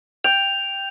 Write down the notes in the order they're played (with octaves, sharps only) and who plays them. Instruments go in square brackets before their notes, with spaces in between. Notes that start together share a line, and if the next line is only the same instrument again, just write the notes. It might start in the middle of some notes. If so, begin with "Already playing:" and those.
[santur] G5 [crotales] F7